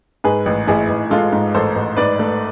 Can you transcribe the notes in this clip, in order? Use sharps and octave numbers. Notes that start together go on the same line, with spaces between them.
G#2 G#4 B4
A1
A1 E4 G#4
A1
G#3 F4 A4
G#2
A1 A4 C5
A1
G#2 B4 D5
A3